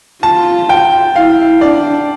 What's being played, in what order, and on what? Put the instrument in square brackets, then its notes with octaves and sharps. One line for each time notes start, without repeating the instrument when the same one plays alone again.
[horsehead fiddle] F4 [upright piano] A5
[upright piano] G5
[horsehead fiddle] E4 [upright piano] F5
[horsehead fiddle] D4 [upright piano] D5